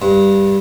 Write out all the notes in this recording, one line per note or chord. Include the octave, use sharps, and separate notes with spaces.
G2